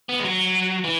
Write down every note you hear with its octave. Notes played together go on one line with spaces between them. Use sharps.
B3
G#3
F#3
E3